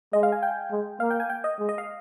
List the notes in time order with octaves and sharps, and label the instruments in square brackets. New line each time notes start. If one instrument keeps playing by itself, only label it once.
[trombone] G#3 [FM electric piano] D#5
[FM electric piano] F5
G#5
G5
[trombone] G#3
[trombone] A#3 [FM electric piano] F5
[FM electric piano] G5
G#5
G5
D#5
[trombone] G#3
[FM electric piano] D#5
F5